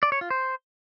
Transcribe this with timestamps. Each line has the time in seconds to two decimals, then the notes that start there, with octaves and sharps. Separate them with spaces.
0.03 D5
0.12 C#5
0.21 F4
0.30 C5